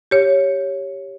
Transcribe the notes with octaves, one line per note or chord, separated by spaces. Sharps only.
G4 C#5